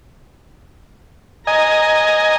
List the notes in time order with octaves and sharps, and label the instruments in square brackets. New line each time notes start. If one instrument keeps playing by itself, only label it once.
[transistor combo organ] D#5 G#5 [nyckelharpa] A#5